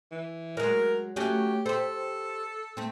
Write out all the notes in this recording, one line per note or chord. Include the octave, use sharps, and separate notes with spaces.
E3
F#3 G#3 A#4
F#3 A3 C#4 G4
G4 A4 C5
A3 C4